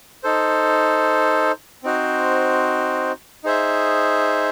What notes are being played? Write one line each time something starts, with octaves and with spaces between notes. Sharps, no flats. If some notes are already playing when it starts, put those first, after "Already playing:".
D#4 A4 C5
C4 D#4 F#4 C5
D#4 G#4 C5 E5